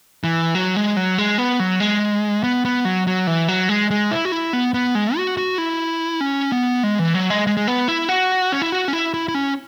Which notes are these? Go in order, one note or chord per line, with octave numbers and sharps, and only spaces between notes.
E3
F#3
G#3
F#3
G#3
B3
F#3
G#3
B3
B3
F#3
F#3
E3
F#3
G#3
G#3
E4
F#4
E4
B3
B3
G#3
F#4
F#4
E4
C#4
B3
G#3
E3
F#3
G#3
G#3
G#3
B3
E4
F#4
C#4
E4
F#4
C#4
E4
E4
E4
C#4